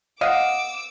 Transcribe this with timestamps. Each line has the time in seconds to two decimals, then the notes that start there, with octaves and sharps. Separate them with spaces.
0.21 D#5 F5 F#5 D6 E6